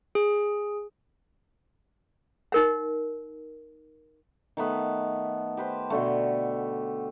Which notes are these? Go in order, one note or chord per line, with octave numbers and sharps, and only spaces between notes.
G#4
D#4 A#4 F#5
D#3 A3 B3
G4 B4 C5
B2 D3 A3